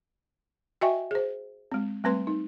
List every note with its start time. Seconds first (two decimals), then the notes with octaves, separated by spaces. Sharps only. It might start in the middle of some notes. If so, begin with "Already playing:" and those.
0.81 F#4 D#5 E5 G5 G#5 C#6
1.11 G#4 C5
1.72 G#3 C4
2.04 G3 A3 C4 B4 C6
2.27 D#4